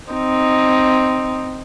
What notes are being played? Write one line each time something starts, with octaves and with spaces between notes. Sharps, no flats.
C4 D#4